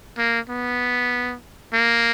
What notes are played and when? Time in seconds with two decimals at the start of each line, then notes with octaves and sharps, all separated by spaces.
0.18 A#3
0.49 B3
1.73 A#3